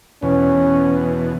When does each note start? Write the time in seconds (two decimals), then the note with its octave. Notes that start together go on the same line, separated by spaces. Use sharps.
0.23 E2 B2 C#4